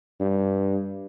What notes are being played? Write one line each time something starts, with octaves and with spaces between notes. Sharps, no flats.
G2